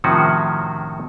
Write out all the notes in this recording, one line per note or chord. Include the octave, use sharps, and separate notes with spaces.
A2 C3 D#3 F3 C#4 F#4